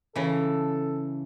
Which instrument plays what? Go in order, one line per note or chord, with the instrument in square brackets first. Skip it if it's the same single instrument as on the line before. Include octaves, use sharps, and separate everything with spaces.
[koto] C#3 E3 [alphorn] A4